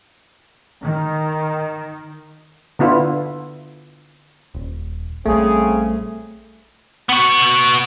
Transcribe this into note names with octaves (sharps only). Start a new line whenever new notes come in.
D#3
D3 B3 E4 F4
D#1
A#1 C#3 G3 A3 C4 G#4
B3 F#4